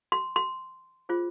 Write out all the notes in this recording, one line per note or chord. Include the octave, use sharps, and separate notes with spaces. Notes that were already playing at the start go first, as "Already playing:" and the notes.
C6
C6
F4 G#4 C5